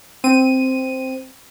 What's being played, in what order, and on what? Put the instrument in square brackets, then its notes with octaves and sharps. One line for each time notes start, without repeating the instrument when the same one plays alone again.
[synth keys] C4 D#7